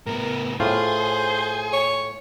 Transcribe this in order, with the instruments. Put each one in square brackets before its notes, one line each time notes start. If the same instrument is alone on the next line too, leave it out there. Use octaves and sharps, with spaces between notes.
[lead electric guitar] A2 B3 [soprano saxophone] A#4
[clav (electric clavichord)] A2 F4 [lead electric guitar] G#4 [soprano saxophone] C5
[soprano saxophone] C#5